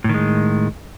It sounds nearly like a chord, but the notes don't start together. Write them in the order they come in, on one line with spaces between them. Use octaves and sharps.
A2 D#3 G#3